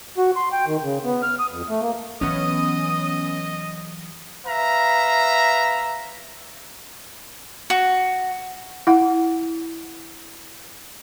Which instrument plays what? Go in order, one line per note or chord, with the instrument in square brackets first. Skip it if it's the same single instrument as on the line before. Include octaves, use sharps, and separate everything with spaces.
[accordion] F#4
C6
G5
D#3
C#3
B3
F6
D#6
F2
A3
A#3
[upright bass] E3 F#3 [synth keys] B3 C#4 [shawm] D#5 [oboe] D#6
[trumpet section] B4 E5 F5 A#5
[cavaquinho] F#4
[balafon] E4 F#5